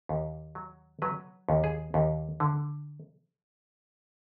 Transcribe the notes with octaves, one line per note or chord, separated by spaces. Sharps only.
D#2
F#3
F#3 B4
D#2
G#4
D#2
D3